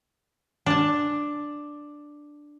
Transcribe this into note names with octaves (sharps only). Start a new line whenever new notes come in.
D4 A5